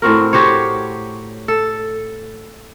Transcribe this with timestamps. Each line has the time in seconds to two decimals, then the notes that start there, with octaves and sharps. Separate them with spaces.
0.02 A2 C4 F#4 A#4
0.33 F#4 G4 C5 C#5
1.48 A4